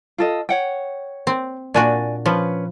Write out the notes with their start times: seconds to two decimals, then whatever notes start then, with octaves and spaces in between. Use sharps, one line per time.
0.18 F4 A4 D#5
0.49 C#5 F#5 G5
1.27 C4
1.74 A#2 D4 F#4 D5 G#5
2.26 F3 C#4 B4